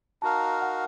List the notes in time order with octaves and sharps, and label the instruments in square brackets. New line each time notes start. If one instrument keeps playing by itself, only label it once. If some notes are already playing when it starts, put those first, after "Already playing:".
[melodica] D#4 F#4 A#4 F5 [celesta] A5
[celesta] F#5